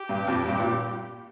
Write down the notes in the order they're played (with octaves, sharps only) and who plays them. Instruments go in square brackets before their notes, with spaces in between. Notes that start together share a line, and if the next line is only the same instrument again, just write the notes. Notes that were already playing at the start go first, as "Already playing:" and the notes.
Already playing: [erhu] G4
[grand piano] G2
F2
G2
A#2